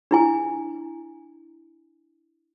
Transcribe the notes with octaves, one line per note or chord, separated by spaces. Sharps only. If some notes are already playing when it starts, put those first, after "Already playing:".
D4 E4 G#5